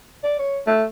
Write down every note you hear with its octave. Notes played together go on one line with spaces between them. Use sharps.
D5
C#5
A3